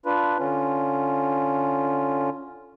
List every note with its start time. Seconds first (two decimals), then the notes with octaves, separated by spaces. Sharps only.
0.06 D4 F4 B4
0.39 D3 C#4 F4